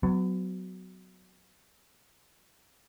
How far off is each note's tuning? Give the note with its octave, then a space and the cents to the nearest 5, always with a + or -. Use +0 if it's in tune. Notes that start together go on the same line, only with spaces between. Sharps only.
F#3 +5 B3 +35